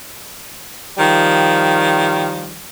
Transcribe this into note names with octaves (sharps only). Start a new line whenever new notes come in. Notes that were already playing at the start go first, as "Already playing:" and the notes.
D#3 F3 G3